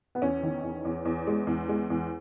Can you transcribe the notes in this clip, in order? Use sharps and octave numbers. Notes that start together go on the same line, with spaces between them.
B3
E2 C#4
D#3
E2
E2
E2
G#3
E2
G#3
E2